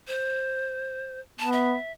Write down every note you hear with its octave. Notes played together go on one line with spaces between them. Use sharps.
C5
B3 A5
E5